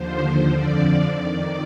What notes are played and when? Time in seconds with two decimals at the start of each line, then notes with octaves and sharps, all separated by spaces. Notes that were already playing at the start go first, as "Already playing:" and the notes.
Already playing: D#2 D3 F3 C5
0.52 F2 D3 F3 D5
1.13 F2 D#3 D5